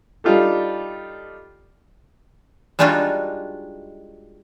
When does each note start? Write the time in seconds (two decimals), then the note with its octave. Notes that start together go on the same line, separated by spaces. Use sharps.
0.24 G3 D4 D#4 F4 G4 A4
2.79 G3 G#3 D4 D#4 F4 F#4